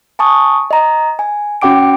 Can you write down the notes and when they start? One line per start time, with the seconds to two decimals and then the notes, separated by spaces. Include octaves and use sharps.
0.19 G#5 A5 C#6 D#6
0.71 D#5 A#5
1.19 G#5
1.62 C#4 F#4 F#5 G5 D6 D7